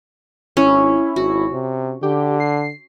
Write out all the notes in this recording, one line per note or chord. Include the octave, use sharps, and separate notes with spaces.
G#1 C#4 E4
G#1 F#4
C3
D3 G4
C7